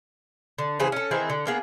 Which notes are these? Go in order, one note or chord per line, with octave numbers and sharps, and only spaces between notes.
D3
C#3 E3 G#4 C5
C#4 A4
D#3 E3 C4 G#4
D3
A#3 B3 G#4